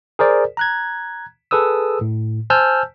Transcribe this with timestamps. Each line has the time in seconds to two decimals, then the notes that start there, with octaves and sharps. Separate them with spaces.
0.19 G#4 A#4 C5 D5
0.57 A#5 F#6 G#6
1.51 G#4 A4 B4 D#6 E6
2.01 A2
2.50 C5 G#5 A5 E6 F6 G6